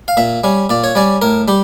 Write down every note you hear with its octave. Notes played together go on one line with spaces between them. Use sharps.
F5
A#2 E5
G3 C#4
A#2 D5
C#5
G3 C#4 D5
A2 A#4
G3 G4